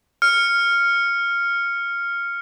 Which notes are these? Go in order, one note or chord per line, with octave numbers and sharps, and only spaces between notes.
F6 C#7